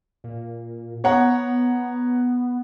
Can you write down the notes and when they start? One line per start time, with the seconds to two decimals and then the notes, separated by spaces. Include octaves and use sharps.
0.24 A#2
1.04 B3 C#5 F#5 A#5